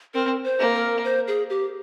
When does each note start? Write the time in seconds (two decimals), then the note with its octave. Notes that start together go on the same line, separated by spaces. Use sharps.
0.14 C4 A#4
0.44 C5
0.60 A#3
0.74 A#4
1.04 C5
1.28 G#4
1.50 G4